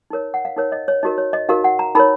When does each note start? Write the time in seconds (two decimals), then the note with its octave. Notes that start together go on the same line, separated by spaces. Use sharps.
0.10 D#4 A#4 C#5
0.34 F#5
0.45 F5
0.56 D#4 A#4 C#5
0.72 D#5
0.88 C#5
1.03 D#4 F#4 A#4 D#5
1.18 C#5
1.33 D#5
1.49 D#4 F#4 A#4 F5
1.64 F#5
1.79 A#5
1.95 D#4 A#4 C#5 B5